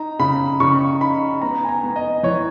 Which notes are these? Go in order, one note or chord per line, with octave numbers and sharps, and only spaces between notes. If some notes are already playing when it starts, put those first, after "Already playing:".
Already playing: D#4 A#5
C#3 B5
C#3 C#6
D#4 B5
B3 A#5
G#5
A#5
B3
D#5
E3 C#5